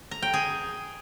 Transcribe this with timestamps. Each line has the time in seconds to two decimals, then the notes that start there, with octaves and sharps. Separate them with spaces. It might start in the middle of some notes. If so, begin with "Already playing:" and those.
0.11 A#5
0.22 G5
0.34 G#4